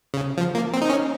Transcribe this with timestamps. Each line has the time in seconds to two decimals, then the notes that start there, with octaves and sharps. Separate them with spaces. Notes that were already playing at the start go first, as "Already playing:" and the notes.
0.14 C#3
0.37 F3
0.55 A#3
0.73 C4
0.82 D#4
0.90 C#4